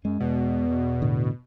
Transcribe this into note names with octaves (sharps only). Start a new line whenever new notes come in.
F#2 G#3
E2 B2
A2 D3